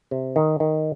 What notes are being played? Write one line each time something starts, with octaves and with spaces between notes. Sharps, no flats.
C3
D#3
D#3